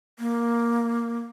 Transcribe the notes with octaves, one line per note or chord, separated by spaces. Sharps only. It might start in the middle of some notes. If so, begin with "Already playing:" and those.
A#3